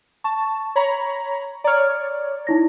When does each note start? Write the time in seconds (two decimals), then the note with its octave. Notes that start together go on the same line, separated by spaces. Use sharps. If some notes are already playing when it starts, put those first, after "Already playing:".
0.24 A5 C#6
0.76 C#5 A#5 B5
1.64 C#5 D5 A#5 F6
2.47 D#4 E4 A#6